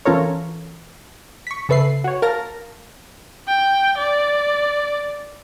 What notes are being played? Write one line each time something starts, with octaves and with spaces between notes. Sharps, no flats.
E3 C#4 F4 A4 A#4 C#5
C#6 B6
C#3 A4 B4 E5 C7
F#4 C#5
A#4 F5 A5 F6 A#6
G5
D5